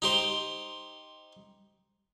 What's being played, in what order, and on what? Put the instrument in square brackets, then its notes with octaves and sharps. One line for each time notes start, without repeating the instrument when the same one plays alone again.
[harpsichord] D#4 G4 C5